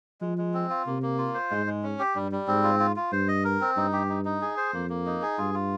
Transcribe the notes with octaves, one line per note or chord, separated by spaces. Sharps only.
F3 G#3
G#3
C4
F4
C3 A#3
A#3
F4
C5
G#2 G#3
G#3
C#4
G4
G2 G3
G3
G#2 C4
F4
F4
F4
G2 C5
D#5
A#4
C4
G2 D#4
G4
D#4
D#4
G#4
C5
F2 A#3
A#3
D#4
G#4
G2 F4
F4